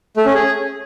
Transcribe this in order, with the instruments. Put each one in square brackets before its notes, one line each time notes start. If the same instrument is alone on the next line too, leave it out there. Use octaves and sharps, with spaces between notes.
[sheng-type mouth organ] A3
C#4
G#4